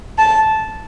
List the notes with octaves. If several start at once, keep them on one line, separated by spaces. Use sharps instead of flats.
A5